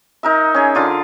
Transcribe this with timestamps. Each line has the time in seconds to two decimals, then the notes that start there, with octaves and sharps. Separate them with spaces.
0.23 D#4 A#4 E5
0.54 C#4 G#4
0.75 D3 F4 D5